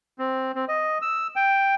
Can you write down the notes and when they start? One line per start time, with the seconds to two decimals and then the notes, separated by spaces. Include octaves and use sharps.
0.19 C4
0.55 C4
0.69 D#5
1.02 E6
1.36 G5